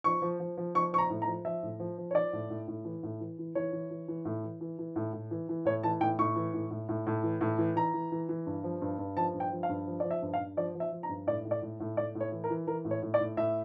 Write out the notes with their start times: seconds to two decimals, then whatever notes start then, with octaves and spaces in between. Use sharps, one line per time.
0.04 F3 C#6
0.22 F3
0.40 F3
0.57 F3
0.75 F3 C#6
0.92 F3 C#6
0.98 A#5
1.10 A2
1.22 A#5
1.27 F3
1.45 F3 E5
1.63 A2
1.80 F3
1.98 F3
2.11 C#5
2.15 F3 D5
2.33 A2
2.50 A2
2.68 A2
2.85 E3
3.03 A2
3.20 E3
3.39 E3
3.55 E3 C#5
3.73 E3
3.90 E3
4.08 E3
4.25 A2
4.44 E3
4.61 E3
4.79 E3
4.96 A2
5.13 A2
5.31 E3
5.49 E3
5.65 A2 C#5
5.83 E3 A5
6.00 A2 G5
6.19 A2 C#6
6.36 E3
6.54 A2
6.71 A2
6.89 A2
7.07 A2
7.23 E3
7.41 A2
7.58 E3
7.76 E3 A#5
7.94 E3
8.12 E3
8.29 E3
8.47 G2
8.64 F3
8.82 G2
8.99 G2
9.17 F3 A5
9.34 G2
9.40 G5
9.52 F3
9.63 F5
9.69 G2
9.87 F3
10.00 F3 D5
10.11 E5
10.22 G2
10.34 F5
10.39 G2
10.57 F3 D5
10.75 F3
10.80 E5
10.92 F3
11.03 A#5
11.09 G2
11.27 A2 D5
11.45 A2
11.51 D5
11.62 A2
11.80 A2
11.97 A2 D5
12.15 A2
12.20 C#5
12.32 E3
12.44 A#4
12.50 E3
12.67 E3 A#4
12.85 A2
12.91 C#5
13.02 A2
13.14 D5
13.20 A2
13.37 A2 E5